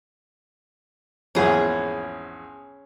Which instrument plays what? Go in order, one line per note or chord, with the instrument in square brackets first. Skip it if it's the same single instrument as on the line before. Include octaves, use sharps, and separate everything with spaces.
[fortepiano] A#1 E2 G#2 [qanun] C#4 G#4